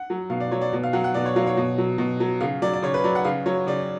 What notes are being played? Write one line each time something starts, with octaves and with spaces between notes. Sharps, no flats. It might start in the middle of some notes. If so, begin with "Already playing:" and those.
Already playing: F#5
F#3
B2 F5
D5
F#3 C#5
D5
B2
F5
F#3 F#5
F#5
B2 D5
C#5
F#3 F5
C#5
B2
F#3
B2
F#3
C#3 F5
F#3 D5
D5
C#3 C#5
B4
F#3 D5
F#5
C#3 F5
F#3 C#5
C#3 D5